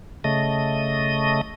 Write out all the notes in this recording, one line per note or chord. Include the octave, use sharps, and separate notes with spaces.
C#3 A3 D#5